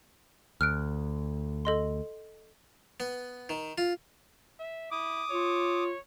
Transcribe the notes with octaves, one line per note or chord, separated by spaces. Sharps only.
D2 F6 F#6 D7
A4 D#5 C6
B3
D#3
F4
E5
E4 D6 D#6
F4 C#5